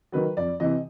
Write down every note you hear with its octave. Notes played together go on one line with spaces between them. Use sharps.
D#3 F#3 B4
F2 D5
C3 E3 D#5